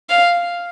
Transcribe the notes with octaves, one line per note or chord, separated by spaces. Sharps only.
F5